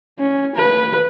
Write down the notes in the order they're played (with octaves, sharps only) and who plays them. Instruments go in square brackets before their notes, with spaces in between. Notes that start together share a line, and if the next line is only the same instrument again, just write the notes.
[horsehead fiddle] C#4
B4